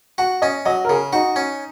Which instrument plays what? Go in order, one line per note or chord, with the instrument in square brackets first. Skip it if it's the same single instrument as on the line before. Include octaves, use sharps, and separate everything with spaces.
[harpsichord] F#4 [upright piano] F#5
[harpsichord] C#4 [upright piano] D#5
[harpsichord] F#3 [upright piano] D#5
[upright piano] A#4
[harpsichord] C#3 [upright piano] G#4
[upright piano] D#4 [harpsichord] F#4
[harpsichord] C#4